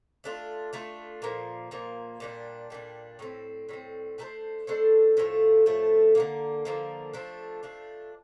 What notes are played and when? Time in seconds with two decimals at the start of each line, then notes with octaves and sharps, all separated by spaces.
0.24 A3 D4 F4
0.73 A3 D4 F4
1.22 A#2 F3 A#3
1.71 A#2 F3 A#3
2.20 A#2 G3 D4
2.70 A#2 G3 D4
3.19 A2 G3 C4
3.69 A2 G3 C4
4.18 A3 D4 A4 C5
4.67 A3 D4 A4 C5
5.17 A2 F3 A3
5.66 A2 F3 A3
6.15 D3 F3 A#3
6.65 D3 F3 A#3
7.14 F3 A3 D4
7.63 F3 A3 D4